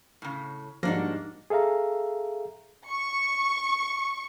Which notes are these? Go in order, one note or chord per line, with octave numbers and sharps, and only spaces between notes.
A2 C#3
G#2 F3 G3 A#3 D4 F#4 A#6
G#4 A4 E5 F5 A#5
C#6